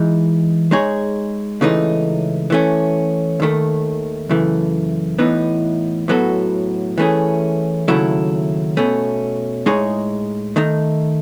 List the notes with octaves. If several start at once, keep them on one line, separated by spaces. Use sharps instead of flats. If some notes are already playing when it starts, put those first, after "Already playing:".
Already playing: E3 G#3 D#4
G#3 D#4 G#4 C#5
C#2 C#3 E3 A3 D#4
E3 A3 C#4
D#2 D#3 A3
F#2 C#3 E3 A3
A2 E3 B3 D#4
A2 F#3 B3 F#4 A4
E3 A3 C#4 G#4
D#2 C#3 F#3 A3 E4
B2 A3 C#4
A2 G#3 D#4 G#4 C#5
D#3 A3 D#4